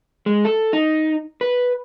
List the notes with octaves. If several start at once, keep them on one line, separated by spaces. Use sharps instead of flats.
G#3
A4
D#4
B4